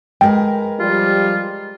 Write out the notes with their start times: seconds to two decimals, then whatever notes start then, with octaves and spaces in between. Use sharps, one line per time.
0.21 G#3 A#4 B4 G5
0.80 F3 G3 F4